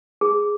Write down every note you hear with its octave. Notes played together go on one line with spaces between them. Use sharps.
G#4